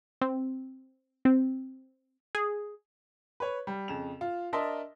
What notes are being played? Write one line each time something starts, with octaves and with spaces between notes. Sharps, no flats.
C4
C4
G#4
B4 C#5
G3
F2 C#3 E7 F7
F4
D4 A#4 D#5 E5 A5 C6